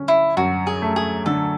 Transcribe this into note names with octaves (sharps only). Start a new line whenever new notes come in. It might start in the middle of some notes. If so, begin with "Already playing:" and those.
Already playing: D3 C#4
E4
F#2 F#4
G#4
A3
G#4
D3 A4